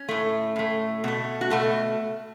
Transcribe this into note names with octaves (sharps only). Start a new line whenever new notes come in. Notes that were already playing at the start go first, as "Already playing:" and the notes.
Already playing: C#4
A2 A3
A2 A3
B2 A3
F#4
B2 A3 A4